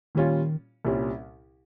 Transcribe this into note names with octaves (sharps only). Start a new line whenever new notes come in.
A#2 D#3 G3 C#4 F4
C2 A#2 G3 C#4